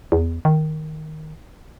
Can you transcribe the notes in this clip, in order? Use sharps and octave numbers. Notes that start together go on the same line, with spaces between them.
E2
D#3